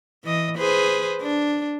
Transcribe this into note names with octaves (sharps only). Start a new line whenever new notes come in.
E3 D#5
G#4 B4 C5
D4